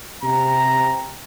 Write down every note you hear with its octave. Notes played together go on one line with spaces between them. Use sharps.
C3 A#5